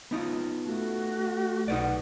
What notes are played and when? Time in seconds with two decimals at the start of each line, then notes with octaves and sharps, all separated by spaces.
0.11 B3 D#4 F4
0.65 A3 F#4
1.68 B1 D#4 B4 D5 F#5